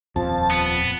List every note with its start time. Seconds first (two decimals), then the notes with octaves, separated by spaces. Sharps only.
0.16 D#1 F2 F3 A5
0.51 B3